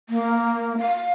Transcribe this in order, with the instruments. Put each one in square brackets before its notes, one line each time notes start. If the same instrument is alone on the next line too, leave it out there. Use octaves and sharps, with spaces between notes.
[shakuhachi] A#3
F5